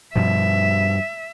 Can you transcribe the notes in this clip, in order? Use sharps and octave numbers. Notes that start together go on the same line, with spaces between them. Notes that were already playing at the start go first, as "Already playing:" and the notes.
G2 B2 F3 E5